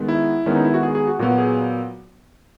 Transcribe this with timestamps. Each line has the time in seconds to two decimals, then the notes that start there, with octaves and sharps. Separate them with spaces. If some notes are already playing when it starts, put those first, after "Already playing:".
Already playing: D#3 G#3 B3
0.08 E4
0.46 D#3 G#3 B3 C#4
0.55 D#4
0.65 E4
0.74 F#4
0.83 G#4
0.95 G#4
1.07 F#4
1.19 A#2 F#3 B3 F#4
1.38 G#4